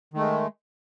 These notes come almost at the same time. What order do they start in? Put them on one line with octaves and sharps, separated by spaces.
D#3 A3 G#3